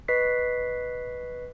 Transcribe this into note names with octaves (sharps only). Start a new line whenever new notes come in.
B4 D#5 C#6 B6 C7